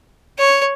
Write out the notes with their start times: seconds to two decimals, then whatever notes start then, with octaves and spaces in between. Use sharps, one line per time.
0.39 C#5